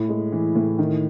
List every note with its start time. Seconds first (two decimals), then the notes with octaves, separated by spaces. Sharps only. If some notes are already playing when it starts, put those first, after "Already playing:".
Already playing: A2
0.09 G#3
0.32 E3
0.55 A2
0.79 D#3